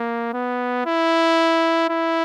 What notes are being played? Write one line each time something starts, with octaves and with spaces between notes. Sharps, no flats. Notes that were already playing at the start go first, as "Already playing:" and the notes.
Already playing: A#3
B3
E4
E4